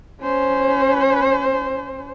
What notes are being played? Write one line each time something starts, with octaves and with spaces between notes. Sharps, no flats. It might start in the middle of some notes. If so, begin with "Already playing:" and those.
C#4 C5